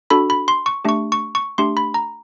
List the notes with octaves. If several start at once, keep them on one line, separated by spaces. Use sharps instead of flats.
D4 F#4 A4 B5
B5
C6
C#6
A3 D4 G4 C#6
C#6
C#6
A3 D4 G4 C6
B5
A#5